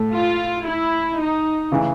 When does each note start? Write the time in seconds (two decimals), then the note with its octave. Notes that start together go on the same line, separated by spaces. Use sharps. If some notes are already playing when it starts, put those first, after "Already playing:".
Already playing: A2 A3
0.12 F4
0.65 E4
1.17 D#4
1.72 C#3 E3